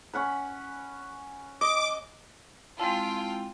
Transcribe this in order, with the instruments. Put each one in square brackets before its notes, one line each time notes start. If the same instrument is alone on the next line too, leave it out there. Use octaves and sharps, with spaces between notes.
[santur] C#4 F#5 B5
[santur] D#5 [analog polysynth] D6
[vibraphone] G#3 C4 E4 [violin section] F4 G5 [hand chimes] A5